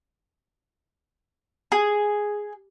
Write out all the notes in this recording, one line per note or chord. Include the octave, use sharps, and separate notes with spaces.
G#4